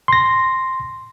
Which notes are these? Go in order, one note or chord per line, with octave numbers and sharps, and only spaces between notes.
C6 A#6